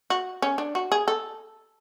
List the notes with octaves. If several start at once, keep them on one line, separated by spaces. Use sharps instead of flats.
F#4
C#4
D4
F#4
G#4
A4